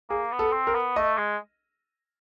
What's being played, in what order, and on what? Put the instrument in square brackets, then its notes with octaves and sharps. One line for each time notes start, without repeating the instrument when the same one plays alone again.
[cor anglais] A#3 [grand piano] G#4
[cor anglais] B3
[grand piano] A4
[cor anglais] C4
[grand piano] A#4
[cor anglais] B3
[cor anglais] A3 [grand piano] D#5
[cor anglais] G#3